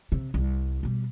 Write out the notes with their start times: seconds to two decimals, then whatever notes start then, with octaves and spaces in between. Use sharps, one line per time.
0.12 C3
0.34 C2
0.83 B2 G3